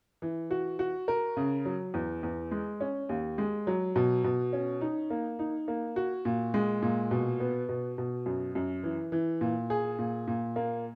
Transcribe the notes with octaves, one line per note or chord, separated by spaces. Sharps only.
E3
F#4
F#4
A#4
C#3
F#3
E2
E2
G#3
C#4
D#2
G#3
F#3
B2
B2
C#4
D#4
A#3
D#4
A#3
F#4
A#2
G#3
A#2
B2
B3
B2
B2
F#2
F#2
E3
E3
A#2
G#4
A#2
A#2
A#3